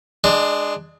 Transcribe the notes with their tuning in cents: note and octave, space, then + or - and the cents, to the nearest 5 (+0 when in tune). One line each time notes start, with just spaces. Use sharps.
G#3 +0 D4 +15 D5 +45